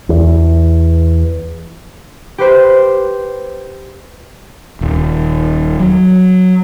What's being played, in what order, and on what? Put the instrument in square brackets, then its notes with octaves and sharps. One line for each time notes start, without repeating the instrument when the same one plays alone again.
[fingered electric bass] E2
[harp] G4 B4 C5
[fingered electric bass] D#1
F#3